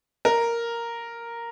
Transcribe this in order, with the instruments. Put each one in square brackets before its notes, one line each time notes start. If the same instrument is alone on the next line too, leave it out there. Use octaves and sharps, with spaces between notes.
[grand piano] A#4